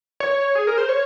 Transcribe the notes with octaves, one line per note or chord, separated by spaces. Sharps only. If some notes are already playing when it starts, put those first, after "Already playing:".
C#5
G#4
A#4
C5
C#5